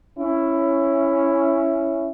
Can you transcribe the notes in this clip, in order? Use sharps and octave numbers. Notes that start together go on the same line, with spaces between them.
C#4 E4